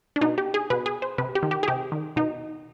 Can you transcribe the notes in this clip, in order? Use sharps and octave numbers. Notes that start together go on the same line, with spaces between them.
D4
B2 D#4
G4
G#4
B2 B4
G#4
C5
C3 B4
G4
D#3
G4
G#4
C3 G4
D#3
B2 D#4